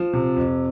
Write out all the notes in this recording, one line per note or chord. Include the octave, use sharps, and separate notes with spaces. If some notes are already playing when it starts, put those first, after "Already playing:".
Already playing: F3
C3
F2